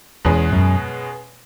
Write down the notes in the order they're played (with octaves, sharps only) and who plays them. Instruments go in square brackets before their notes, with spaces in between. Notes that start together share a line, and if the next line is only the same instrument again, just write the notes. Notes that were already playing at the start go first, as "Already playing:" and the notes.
[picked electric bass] E2 [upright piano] B2 G#3 C#4 G#4 B4
[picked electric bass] F#2